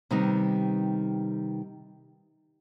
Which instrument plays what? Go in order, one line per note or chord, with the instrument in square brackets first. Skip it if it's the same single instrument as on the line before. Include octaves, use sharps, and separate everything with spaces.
[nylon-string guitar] C3 D#3 G3 B3 D#4